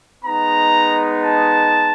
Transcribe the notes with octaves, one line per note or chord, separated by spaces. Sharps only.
G#3 B3 D#4 A#5
A5